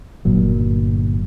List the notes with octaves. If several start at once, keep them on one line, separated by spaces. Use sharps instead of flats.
G1 A#2 F#3